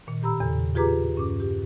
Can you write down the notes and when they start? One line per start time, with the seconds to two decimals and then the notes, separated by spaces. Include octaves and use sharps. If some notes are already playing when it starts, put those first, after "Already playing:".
0.07 A#2 D#3
0.22 A2 G4 A#5 B5 E6
0.40 E2 C#3 A4
0.75 F4 G4 G#4 B4 A#5 D6
1.15 G2 C#4 D6
1.40 G4